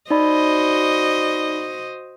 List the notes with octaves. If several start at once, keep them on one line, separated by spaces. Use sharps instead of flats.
D#4 F#4 C5 D5 D#5 B5